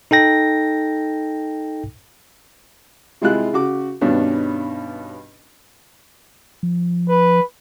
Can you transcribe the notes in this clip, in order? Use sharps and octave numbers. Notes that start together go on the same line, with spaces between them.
D#4 A4 G5 A#6
C3 G3 G#3 E4 F4 F#6
C#3 F#4 D6
G2 B2 D#3 B3 C#4 D4
F3
B4